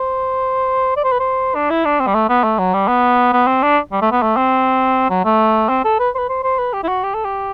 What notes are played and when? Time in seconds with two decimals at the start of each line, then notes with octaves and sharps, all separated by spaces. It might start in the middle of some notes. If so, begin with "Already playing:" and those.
Already playing: C5
0.96 D5
1.04 C5
1.12 B4
1.20 C5
1.55 D4
1.70 E4
1.85 D4
2.00 C4
2.07 G3
2.14 A3
2.29 B3
2.44 A3
2.58 F#3
2.73 G3
2.88 B3
3.33 B3
3.47 C4
3.62 D4
3.92 G3
4.02 A3
4.12 B3
4.22 A3
4.37 C4
5.10 F#3
5.25 A3
5.69 C4
5.84 A4
5.99 B4
6.15 C5
6.18 B4
6.29 C5
6.44 C5
6.59 B4
6.73 G4
6.84 E4
6.88 F#4
7.03 G4
7.14 A4
7.25 G4